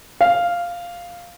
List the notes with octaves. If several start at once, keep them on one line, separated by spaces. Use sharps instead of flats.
F5